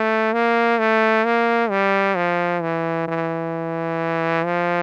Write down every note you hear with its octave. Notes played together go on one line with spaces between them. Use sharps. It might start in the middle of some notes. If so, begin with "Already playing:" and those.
Already playing: A3
A#3
A3
A#3
G3
F3
E3
E3
F3